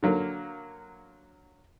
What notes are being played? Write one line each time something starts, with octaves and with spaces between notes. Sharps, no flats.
D3 F#3 A#3